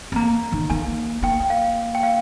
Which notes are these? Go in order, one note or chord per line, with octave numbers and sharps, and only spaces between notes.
C4
A#3 A#5
D#3
A#3 G#5
A#3 G5
G5
F5
G5
F5